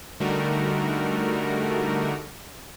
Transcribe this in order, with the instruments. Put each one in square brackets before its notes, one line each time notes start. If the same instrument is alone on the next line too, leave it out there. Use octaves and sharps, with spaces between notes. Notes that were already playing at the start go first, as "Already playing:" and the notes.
[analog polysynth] D3 G3 A3 D#4 F#4 A#4